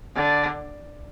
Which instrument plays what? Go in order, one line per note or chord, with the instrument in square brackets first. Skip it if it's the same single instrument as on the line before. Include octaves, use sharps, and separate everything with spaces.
[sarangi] D3